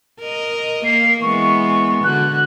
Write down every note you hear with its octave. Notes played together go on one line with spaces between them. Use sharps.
A#4 D#5
A#3 A#4 C7
E3 G#3 B3 C#6
D3 F#4 F#6